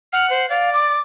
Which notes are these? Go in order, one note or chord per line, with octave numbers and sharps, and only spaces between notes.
F#5 F6
C5
D5 F5
D6